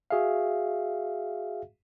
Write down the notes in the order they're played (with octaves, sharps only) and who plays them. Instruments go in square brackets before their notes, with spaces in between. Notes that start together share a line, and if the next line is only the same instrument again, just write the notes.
[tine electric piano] F#4 G#4 E5 F5